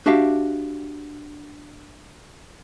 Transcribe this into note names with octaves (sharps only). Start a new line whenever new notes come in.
D4 F#4 G4 E5 F5